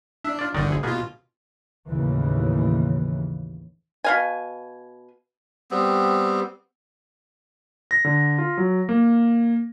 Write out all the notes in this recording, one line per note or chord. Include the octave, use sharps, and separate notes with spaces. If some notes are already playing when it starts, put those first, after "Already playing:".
D4 E5
F4 D5
G1 D3 D#3 D#4 D5
D2 G#4
B2 A#3 B3 F4 G#4
A1 D#2 C#3 E3
B2 F5 G#5
G3 B3 C4
A#6
D3
F4
F#3
A#3